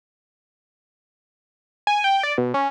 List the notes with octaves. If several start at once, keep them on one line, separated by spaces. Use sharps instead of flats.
G#5
G5
D5
B2
C#4